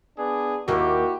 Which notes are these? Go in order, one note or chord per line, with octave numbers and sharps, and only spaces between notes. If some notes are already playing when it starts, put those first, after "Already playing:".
B3 D4 G#4
D#2 A#3 E4 F#4 G4